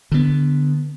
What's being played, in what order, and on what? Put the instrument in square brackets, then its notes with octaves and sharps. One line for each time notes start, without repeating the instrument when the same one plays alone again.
[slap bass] D3 B3